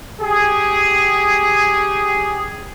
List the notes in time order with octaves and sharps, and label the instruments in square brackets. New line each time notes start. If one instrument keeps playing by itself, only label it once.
[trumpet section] G4 G#4